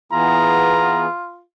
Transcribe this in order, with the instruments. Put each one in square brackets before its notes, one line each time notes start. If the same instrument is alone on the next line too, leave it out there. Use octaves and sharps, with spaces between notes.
[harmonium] E3 B3 G#4 [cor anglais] F4 [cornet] A#5